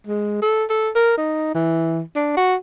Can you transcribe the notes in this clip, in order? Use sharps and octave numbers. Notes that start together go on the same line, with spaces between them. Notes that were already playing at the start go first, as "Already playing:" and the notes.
G#3
A4
A4
A#4
D#4
E3
D4
F#4